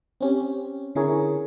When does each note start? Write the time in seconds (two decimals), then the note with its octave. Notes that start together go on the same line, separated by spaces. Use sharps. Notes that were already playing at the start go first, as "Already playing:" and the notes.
0.21 C4 C#4 G4
0.95 D3 C#4 E4 G#4 A#4 C#5